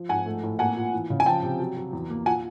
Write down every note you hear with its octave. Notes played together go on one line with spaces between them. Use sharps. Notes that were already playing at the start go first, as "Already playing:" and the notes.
Already playing: F3
G#2 F#5 G#5
A3
A2
A#3 F#5 G#5
A#2
E3
C#3
G#5
F3 G5 A5
C3
F#3
F#3
E2
A#3
A#2 F#5 G#5